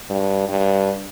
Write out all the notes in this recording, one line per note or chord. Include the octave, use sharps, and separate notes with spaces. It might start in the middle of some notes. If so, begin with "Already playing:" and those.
G2
G2